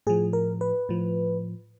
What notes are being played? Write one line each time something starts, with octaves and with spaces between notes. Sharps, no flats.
A2 F3 G#4
A#4
B4
A2 F3